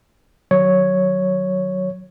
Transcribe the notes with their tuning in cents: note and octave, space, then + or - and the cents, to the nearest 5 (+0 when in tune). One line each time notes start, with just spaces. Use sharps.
D#3 -30 F#3 +0 C#5 +0